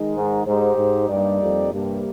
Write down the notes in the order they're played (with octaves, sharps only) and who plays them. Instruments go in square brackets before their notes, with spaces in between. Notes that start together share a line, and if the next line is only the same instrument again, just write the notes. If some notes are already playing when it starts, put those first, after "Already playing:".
Already playing: [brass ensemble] D#3 G#3 D#4
[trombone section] G#2
[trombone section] G#2 [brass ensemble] G#3 D#4 G4 C5
[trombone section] G#2
[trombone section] G2 [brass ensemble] G3 A#3 D#4 G4 D5
[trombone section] F2
[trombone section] G2 [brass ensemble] C3 G3 A#3